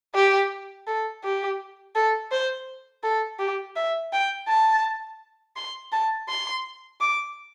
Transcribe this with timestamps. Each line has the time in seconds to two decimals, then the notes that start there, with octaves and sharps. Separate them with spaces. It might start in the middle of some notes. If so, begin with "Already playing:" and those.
0.15 G4
0.87 A4
1.24 G4
1.95 A4
2.31 C5
3.03 A4
3.39 G4
3.76 E5
4.12 G5
4.48 A5
5.56 C6
5.92 A5
6.29 C6
7.01 D6